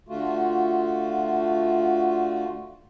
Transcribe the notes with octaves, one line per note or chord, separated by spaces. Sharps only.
D3 A3 F4 F#4